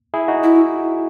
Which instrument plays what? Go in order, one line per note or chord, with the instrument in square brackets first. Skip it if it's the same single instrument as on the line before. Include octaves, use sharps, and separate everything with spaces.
[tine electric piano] E4 G#4
D#4 F#4
[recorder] E4